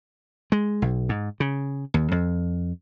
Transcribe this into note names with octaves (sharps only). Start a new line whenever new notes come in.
G#3
B1
G#2
C#3
D#2
F2